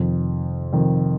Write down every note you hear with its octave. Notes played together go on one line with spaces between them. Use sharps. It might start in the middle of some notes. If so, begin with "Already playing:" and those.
Already playing: F1 F2 D#3
F1 F2 D#3